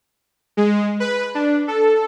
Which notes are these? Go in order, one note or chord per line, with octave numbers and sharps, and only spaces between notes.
G#3
B4
D4
A4